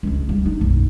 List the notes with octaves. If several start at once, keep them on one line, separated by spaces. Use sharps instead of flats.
C#2 C#3
G3
D#4
B1 F#2